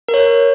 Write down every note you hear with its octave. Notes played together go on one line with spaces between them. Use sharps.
A#4
C#5